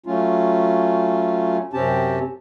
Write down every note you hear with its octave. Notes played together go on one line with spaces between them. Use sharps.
F#3 A3 C#4 F4
F#2 C3 C4 C#4 G4 A5